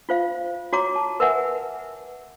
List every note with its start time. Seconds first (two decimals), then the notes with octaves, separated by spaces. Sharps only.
0.09 F4 C5 F5
0.73 F#4 C#5 A#5 D6
0.96 A5
1.20 A#4 B4 E5 F#5 G#5